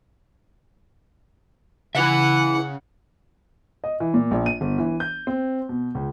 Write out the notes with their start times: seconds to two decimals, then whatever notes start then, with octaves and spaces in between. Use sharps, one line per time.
1.95 C#3 E4 B4 E5 F#5
3.84 D#5
4.00 E3
4.14 A#2
4.31 A#1
4.46 D#7
4.61 G1
4.78 E3
5.00 G6
5.27 C4
5.69 B2
5.95 C#2